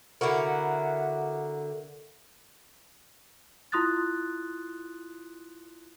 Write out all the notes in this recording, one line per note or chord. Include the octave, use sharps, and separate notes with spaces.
D3 E4 F#4 A#4
E4 F4 C6 D#6 F#6 A6